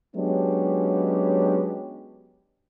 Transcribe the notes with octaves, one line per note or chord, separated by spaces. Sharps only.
F#3 G#3 B3 C#4 D4 G4